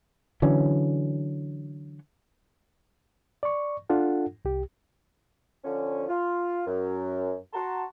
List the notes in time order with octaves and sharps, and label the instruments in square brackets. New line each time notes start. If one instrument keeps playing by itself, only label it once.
[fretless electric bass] D3 E3 F#3 C#4
[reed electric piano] D5 C#6
D4 F4 A4 F#5
C2 G4
[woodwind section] D3 F3 C#4
F4
F#2
F#4 A5 A#5 C6